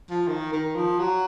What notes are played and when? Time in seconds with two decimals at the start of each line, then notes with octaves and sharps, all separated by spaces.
0.10 F3
0.28 D#3
0.53 D#3
0.76 F3
0.99 F#3